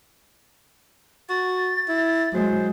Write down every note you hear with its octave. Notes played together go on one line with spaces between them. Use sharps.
F#4 A6
E4
F#3 G#3 C5